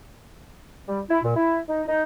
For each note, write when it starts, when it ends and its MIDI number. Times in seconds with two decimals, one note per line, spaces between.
0.89 1.02 55
1.10 1.19 64
1.23 1.32 46
1.36 1.60 64
1.69 1.83 63
1.88 2.03 63